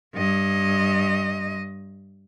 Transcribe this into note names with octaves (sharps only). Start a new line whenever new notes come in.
G2 D#5